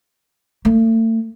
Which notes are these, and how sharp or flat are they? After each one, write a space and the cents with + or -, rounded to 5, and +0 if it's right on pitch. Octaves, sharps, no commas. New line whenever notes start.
A3 +40